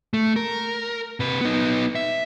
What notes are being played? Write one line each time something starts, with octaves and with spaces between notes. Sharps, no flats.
A3
A#4
C3 B4
B3 D#4
E5